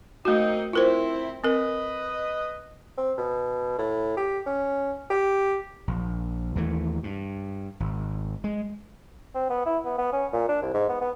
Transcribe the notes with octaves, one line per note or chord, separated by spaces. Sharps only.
A3 A#3 C4 D#4 F#4
C4 E4 F4 A#4 C5
C4 A#4 B4 D#5
C4
B2
A2
G4
C#4
G4
A#1
D#2 E3 A3
G2
G#1
G#3
C4
B3
E4
B3
B3
C#4
A#2
D4
C2
G#2
B3
B3